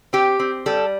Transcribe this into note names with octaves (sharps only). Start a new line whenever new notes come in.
C4 G4
C4
G3 A4